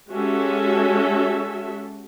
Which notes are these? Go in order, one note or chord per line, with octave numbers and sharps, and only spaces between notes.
G#3 C#4 F#4 G4 A4 E5